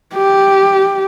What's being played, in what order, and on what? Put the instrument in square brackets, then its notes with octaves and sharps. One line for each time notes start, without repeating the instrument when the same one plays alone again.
[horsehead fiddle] G4